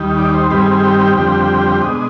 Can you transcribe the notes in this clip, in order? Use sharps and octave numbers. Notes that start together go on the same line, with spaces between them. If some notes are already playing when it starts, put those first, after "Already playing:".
Already playing: D#2 D#3 G3
D5
C5
G2 D#3 G3 C4 B4
G#4
G#4
G4
G4
F2 D3 G3 C4
B2 G#3 D4 D#5